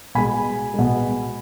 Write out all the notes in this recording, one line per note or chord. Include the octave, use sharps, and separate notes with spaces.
B2 G#3 G#5 B5
B2 G#3